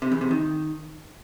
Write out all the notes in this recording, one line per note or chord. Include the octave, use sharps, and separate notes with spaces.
C3
E2
C3
D#3